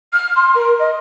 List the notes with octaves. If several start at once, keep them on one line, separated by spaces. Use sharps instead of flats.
F6
C6
A#4
D#5